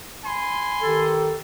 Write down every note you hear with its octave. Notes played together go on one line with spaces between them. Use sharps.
G#5 B5 C6
D#3 G4 A4